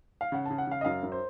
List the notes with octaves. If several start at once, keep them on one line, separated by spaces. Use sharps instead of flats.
F5
C#3 F#5
A5
C#3
F#5
C#3 F5
D#5
F#2 F5
F#2
C5